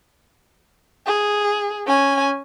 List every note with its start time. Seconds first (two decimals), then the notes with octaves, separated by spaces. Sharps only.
1.07 G#4
1.87 C#4 G#5